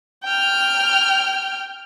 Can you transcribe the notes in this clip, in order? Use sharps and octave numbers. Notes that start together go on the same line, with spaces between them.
G5 F6